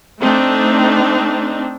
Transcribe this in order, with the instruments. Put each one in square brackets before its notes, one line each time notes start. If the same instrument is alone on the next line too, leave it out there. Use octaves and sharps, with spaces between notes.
[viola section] A3 C4 D4 D#4